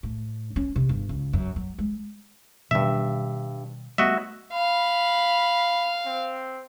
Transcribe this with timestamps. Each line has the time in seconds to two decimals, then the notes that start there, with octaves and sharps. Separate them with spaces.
0.03 A2
0.56 C#4
0.76 C3
0.89 G1
1.09 C#2
1.33 F#2
1.56 F#3
1.78 G#3
2.71 G2 B2 D#3 G3 E5
3.98 G3 A3 B3 F#4 D#5 E5
4.53 F5 B5
6.06 C4